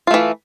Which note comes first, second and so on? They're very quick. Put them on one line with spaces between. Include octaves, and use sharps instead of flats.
F4 A3 E3